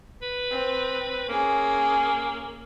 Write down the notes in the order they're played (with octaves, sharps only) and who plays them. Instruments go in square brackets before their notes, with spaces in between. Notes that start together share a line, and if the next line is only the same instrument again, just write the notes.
[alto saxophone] B4
[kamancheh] C4
[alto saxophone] A#3 [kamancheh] C#4 G#4